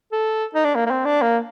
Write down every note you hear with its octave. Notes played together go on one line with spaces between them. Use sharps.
A4
D#4
D4
A#3
A#3
C4
D4
A#3